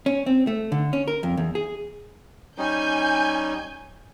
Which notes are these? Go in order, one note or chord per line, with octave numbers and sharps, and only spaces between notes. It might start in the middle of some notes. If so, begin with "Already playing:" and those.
C#4
C4
A3
D3
C#4
A#4
F2
E2
G#4
G3 C#4 D#4 G#5 G6